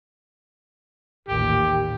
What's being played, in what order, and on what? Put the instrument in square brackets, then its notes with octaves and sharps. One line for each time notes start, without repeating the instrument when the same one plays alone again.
[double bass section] A1 D#2 A#2 [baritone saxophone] G4